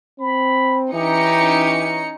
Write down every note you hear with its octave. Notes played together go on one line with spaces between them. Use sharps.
C4 B5
E3 C#4 D#4 G4 C#7